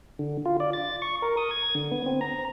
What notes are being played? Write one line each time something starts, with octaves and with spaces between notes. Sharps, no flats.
D3
F4
D5
A6
C#6
A#4
D#6
G#6
D3
B3
C4
A#5